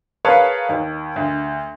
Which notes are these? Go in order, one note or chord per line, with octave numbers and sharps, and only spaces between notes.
G#4 A#4 B4 C#5 F5 A5
D#2
D2